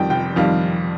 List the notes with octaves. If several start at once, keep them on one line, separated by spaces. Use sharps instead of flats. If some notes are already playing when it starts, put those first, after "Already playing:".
Already playing: F2 D#3 G3 G5
F1 G5
F2 D#3 G3 F5